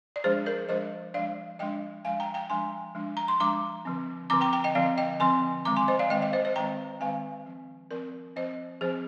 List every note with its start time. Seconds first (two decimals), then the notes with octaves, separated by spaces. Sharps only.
0.16 D5
0.24 F3 G#3 D4 G#4 C5
0.46 A#4 D5
0.69 F3 G#3 D4 C5 D#5
1.14 F3 G#3 D4 D5 F5
1.59 F3 G#3 D4 D#5 G5
2.05 F3 G#3 D4 F5 G#5
2.20 G5 A#5
2.34 G5 A#5
2.50 F3 G#3 D4 G#5 C6
2.95 F3 G#3 D4
3.17 A#5
3.28 C6
3.40 F3 G#3 D4 A#5 D6
3.85 D3 F3 C4
4.30 D3 F3 C4 A#5 D6
4.41 G5 A#5
4.53 G5 A#5
4.64 D#5 G5
4.75 D3 F3 C4 D5 F5
4.98 D#5 G5
5.20 D3 F3 C4 G#5 C6
5.65 D#3 G#3 C4 A#5 D6
5.76 G#5 C6
5.88 C5 D#5
5.99 D5 F5
6.10 D#3 G#3 C4 D#5 G5
6.22 D#5 G5
6.33 C5 D#5
6.45 C5 D#5
6.56 D#3 G#3 C4 G5 A#5
7.00 D#3 G#3 C4 F5 G#5
7.46 F3 C4
7.91 F3 C4 A#4 D5
8.36 F3 C4 C5 D#5
8.81 F3 C4 G#4 C5